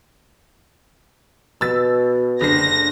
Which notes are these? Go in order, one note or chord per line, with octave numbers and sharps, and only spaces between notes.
B2 E6 A6
F#1 D3 A#6 C7